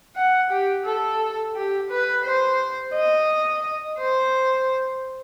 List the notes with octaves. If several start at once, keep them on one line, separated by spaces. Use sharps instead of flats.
F#5
G4
A4
G4
B4
C5
D#5
C5